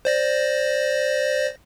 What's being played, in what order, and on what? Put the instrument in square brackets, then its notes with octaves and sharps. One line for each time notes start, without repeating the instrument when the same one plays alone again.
[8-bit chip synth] C5 D5 A#6